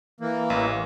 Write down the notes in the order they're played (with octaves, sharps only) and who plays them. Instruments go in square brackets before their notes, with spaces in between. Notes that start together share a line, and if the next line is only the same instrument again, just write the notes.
[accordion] E3 A#3
[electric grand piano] A1